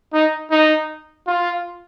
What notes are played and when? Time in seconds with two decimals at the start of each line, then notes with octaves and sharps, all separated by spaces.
0.13 D#4
0.51 D#4
1.27 F4